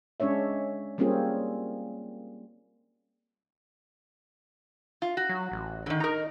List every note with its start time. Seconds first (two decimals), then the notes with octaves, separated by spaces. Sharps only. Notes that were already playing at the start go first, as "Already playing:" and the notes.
0.20 G#3 C#4 D4 C#5 E5
0.98 G3 A#3 C4 C#4 F4 G#4
5.02 F4
5.17 F#4
5.29 F#3
5.52 A1
5.86 D3 D#3
6.00 D#4 A#4 A#5